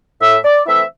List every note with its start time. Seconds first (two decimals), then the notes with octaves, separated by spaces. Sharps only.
0.21 A2 E5
0.44 D5
0.66 E3 A3 C4 E4 E5